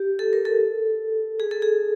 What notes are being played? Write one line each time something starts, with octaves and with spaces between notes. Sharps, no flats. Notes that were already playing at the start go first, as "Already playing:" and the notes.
Already playing: G4
A4
A#4
A4
G#4
A4
G#4